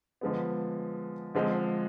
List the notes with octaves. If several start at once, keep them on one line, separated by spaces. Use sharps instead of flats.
D3 F3 G#3 B3
D3 F3 G#3 C4